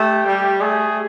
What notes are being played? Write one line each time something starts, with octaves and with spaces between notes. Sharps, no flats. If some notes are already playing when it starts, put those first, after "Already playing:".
Already playing: A3 G4
G3
A3 G#4